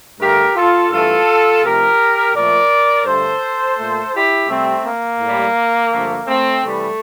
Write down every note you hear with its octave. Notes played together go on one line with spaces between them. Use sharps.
G2 D3 A3 G4 A#4
F4 A4
G2 E3 A3 F4 A4
C3 F3 A3 G4 A#4
A#2 F3 A3 A#4 D5
G2 D3 A3 A4 C5
A#2 A3
E4 G4
C3 G3 A3 C4
A#3
A2 G3
G2 D3 F3 A3
A3 C4
C3 E3 G3 A3